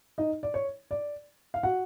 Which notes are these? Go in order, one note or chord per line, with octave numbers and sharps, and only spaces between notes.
D#4 D#5
D5
C#5
D5
F5
F#4 F#5